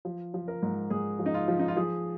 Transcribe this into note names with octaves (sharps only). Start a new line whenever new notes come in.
F3
F3
A#4
G#2
G#2 G#4
F3
D#4
F4
F3
D#4
F4
F3 G#4